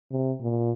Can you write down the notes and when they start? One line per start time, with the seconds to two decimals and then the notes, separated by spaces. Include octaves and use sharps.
0.11 C3
0.41 A#2